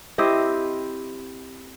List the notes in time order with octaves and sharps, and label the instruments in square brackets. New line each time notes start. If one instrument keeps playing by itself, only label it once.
[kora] C4 E4 G4 D#5